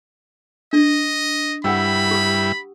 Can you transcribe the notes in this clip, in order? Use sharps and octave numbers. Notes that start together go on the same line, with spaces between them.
D4 D#5
G2 G3 E4 F#5 G5 B5 E6
G4 D#6